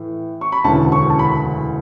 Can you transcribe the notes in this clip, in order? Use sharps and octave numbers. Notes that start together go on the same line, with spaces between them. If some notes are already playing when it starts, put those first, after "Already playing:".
Already playing: A2 E3
C#6
B5
E1 D2 C#3 E3 A5
C#6
A5
B5